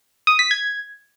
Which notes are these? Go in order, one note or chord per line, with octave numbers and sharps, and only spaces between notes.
D#6
B6
G#6